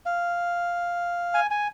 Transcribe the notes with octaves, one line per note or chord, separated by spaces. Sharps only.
F5
G#5
G#5